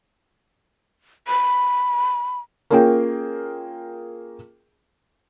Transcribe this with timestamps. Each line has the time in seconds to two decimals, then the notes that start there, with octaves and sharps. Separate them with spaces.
1.28 B5
2.70 A#3 C#4 F4 G#4 A#4 G5